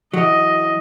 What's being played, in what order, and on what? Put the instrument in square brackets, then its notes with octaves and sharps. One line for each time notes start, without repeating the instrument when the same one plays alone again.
[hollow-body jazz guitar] E3 F#3 [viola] D#5